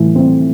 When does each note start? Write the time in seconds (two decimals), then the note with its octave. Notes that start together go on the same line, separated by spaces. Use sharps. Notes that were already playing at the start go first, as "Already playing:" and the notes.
Already playing: A2 E3
0.15 C4